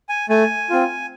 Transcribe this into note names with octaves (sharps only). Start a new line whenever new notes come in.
G#5
A3 G#5
C4 F4